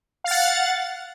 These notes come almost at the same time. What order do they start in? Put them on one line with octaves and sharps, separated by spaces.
F5 A6 F#5